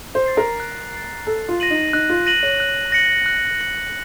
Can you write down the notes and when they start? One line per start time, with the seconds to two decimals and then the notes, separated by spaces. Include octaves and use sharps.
0.15 C5
0.26 A6 C7
0.37 A#4
0.60 F#6
0.93 A6 C7
1.26 A4 F#6
1.48 F4
1.60 A#6 D#7 F#7
1.70 D#4
1.93 D#4 F#6
2.09 F4
2.26 A#6 D#7 F#7
2.43 C#5
2.60 F#6
2.92 A#6 C#7 F#7
3.26 F#6
3.60 A#6 C#7 F#7